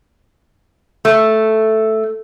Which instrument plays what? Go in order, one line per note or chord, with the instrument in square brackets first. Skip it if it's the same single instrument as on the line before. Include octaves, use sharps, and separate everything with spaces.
[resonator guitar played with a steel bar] A3